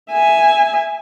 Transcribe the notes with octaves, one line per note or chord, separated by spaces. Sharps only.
E5 G#5